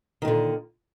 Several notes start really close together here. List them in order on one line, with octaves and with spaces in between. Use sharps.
D#3 A#2 D3